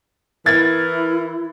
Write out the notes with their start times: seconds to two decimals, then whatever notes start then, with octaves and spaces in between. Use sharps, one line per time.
0.46 E3 E4 A#4 G#6 A6